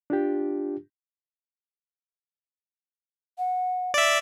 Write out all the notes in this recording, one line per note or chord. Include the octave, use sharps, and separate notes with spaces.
D4 F4 G4
F#5
D5 E5